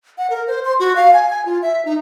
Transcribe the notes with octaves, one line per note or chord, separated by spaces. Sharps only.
F#5
A#4
C5
C6
F#4
F5
G#5
G#5
F4
E5
D#4